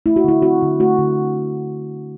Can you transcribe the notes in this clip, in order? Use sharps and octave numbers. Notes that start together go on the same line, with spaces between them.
A3 E4
F#4
D3 E4
C4 F#4
D3
A3 F#4
D3